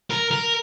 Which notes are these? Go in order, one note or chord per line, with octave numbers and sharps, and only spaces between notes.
A#4
A#4